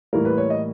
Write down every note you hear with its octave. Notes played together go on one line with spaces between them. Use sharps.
A2 E3 G3 A#3 A#4
B4
C#5
D#5